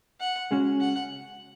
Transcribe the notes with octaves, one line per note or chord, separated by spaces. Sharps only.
F#5
C#3 G#3 C#4 F#4
F#5